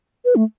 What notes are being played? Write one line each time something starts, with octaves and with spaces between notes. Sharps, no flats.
B4
A3